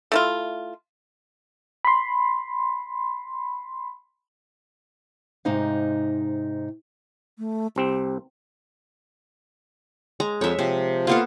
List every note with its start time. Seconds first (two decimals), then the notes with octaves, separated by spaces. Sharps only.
0.12 A3 E4 F4
1.85 B5 C6
5.45 G#2 C3 D#4 C5 F5
7.39 A3
7.76 C2 C4 G4
10.20 G#3 A#5
10.41 F2 C#5 E5
10.59 C3 F3
11.07 A#3 B3 F4 A4